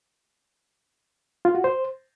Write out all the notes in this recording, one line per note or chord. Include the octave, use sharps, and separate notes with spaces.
F4
F#4
C5